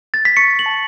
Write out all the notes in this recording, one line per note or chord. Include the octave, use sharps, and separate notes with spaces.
A6
B6
C#6 C#7
F#7
A5